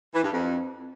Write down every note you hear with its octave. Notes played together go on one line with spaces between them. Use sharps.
E3
G2
F2